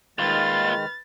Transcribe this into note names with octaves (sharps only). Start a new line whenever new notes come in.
D#2 D#3 G#3 F4 B4 F6 A6